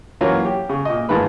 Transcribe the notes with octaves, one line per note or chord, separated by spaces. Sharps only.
E3 F#3 A#3 C#4 F4
G4
C#3
A#2 D#5
A1 G#2 D#3 F4 B4 B5